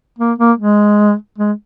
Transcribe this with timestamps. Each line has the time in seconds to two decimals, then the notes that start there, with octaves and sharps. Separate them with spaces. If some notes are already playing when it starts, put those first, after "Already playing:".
0.19 A#3
0.38 A#3
0.58 G#3
1.38 G#3